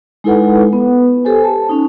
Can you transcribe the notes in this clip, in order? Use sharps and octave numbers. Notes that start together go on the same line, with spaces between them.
G#3 D#4 E4 A4 B4 F#5
B3 B4
G4 A4 C5 G#5
A5
C#4 D#4